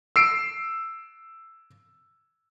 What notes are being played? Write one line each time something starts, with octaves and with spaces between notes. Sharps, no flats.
E6 C7 D7